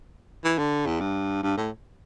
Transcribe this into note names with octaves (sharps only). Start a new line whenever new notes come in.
E3
D3
E2
G2
G2
A2